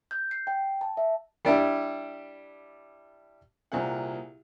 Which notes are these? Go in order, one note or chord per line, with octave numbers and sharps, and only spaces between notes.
G6
C7
G5
A5
E5
G3 D4 E4
C2 A#2 G#4 F#5